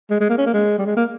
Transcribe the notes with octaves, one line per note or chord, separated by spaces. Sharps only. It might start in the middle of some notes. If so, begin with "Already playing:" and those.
G#3
G#3
A#3
C#4
A#3
G#3
G3
G#3
A#3